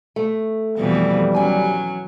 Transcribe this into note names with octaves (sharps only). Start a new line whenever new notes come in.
A3
F2 B2 E3 G3
F#3 C#4 G#5